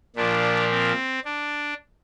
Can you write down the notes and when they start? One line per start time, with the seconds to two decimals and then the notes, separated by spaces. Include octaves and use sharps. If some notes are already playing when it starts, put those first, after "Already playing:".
0.16 A#2 F3 A#3 D4
0.71 C4
1.25 D4